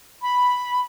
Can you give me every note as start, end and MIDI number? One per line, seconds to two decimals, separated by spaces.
0.21 0.80 83